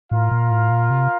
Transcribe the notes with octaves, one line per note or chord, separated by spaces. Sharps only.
A2 F4 A#4 F5
A#2
A2
A#2
C3